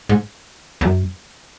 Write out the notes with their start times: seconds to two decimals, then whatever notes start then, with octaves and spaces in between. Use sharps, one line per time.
0.09 G#2
0.81 E2
0.85 F#2